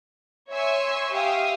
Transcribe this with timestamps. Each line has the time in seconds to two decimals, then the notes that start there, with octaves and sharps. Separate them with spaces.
0.51 C#5 E5 G#5 C6 C#6 E6
1.13 G4 E5 F5 G5 D#6